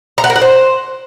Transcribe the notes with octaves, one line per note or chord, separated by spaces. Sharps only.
A#5
F#5
A#4
F#5
C5